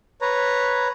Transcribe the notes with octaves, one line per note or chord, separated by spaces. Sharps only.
B4 C#5 A#5